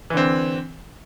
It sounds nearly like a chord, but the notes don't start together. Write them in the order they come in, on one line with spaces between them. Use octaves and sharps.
E3 D3 C4